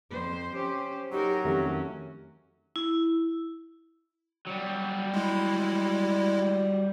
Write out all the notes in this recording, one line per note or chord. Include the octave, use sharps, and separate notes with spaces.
F2 C5
C#4 G4 C5
F#3 D#4 G4 A#4
F2 D#3 A3 C#4
E4
F#3 G3
G#3 E4